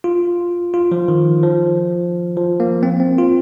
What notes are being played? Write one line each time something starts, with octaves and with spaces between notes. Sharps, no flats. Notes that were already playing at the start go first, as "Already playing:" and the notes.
F4
F4
F3
D#3
F3
F3
A#3
C4
C4
F4